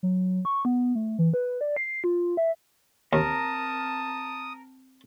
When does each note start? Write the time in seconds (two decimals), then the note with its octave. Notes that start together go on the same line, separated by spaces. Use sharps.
0.03 F#3
0.45 C#6
0.65 B3
0.95 A3
1.19 E3
1.34 B4
1.61 D5
1.76 C7
2.04 F4
2.37 E5
3.13 D#2 C4 A#4 A5 D#6